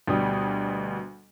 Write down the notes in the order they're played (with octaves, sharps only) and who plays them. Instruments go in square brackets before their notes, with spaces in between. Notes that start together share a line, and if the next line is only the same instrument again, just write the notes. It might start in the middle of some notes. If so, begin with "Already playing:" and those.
[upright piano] D2 B2 G3 D#6